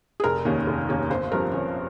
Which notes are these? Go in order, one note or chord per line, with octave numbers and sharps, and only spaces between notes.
G#4
F1 A#4
D#2 D#3 A#3 C#4
F1
D#2 D#3 A#3 C#4
G1 C5
G2 F3 C4 A#4
G1 C#4